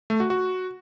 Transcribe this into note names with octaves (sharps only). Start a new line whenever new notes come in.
A3
F#4
F#4